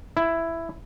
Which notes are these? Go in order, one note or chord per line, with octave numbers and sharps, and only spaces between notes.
E4